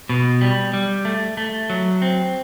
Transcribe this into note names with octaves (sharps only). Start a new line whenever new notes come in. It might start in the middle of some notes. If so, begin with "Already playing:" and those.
B2
G3
G3
A3
A3
F#3
C4